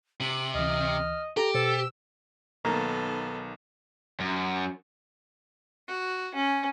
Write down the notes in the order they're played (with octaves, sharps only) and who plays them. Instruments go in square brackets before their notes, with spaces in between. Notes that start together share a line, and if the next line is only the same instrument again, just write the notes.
[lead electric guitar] C3 [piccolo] F#7
[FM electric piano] D2 E3 [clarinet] D#5 [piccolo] F6
[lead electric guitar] G4 [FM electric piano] A4 [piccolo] A#5
[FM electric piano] B2 C5 [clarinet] A4 [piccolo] E6
[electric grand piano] B1 D#3 [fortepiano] A#3 [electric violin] B3 A4
[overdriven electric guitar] F#2
[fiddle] F#4
C#4